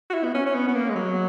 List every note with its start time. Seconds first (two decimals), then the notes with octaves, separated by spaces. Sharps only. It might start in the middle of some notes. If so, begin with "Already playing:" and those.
0.10 F#4
0.14 E4
0.24 B3
0.34 C#4
0.46 C#4
0.54 B3
0.68 B3
0.74 A#3
0.89 G#3
0.95 F#3